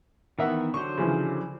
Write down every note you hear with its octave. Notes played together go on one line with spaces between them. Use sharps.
D#3 E3 B3 A#4 E5 F#5
D3 F#3 C5 C#6
C#3 E3 F3